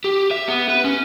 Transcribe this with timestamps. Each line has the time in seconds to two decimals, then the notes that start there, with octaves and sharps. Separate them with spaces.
0.04 G4
0.31 E5
0.48 B3
0.69 B4
0.84 C#4